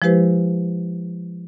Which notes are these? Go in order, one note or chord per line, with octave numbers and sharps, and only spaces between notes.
F3 G#3 E4 G4 B4 C5